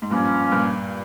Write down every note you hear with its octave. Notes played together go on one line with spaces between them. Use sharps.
G#2
G2 A#2 F3 A#3 C#4 F4
G2 A#2